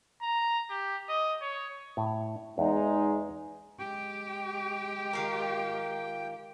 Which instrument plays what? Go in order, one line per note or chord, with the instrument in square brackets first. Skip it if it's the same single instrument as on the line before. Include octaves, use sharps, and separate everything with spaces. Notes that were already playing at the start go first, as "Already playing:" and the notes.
[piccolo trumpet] A#5
G4
D#5
C#5
[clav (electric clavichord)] A2
[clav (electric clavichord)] E2 [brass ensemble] G#3 D#4
[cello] G#3 G4 [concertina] G5
[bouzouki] D#3 F4 A#4